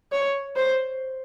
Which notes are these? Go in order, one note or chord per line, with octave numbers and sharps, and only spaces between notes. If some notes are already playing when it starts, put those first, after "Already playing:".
C#5
C5